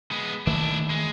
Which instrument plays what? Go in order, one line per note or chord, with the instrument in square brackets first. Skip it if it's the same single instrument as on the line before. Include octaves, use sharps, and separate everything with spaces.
[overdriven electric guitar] G#3 B3
[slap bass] D#3 A3 A#3 [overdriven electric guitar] D4 E4
[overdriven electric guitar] G#3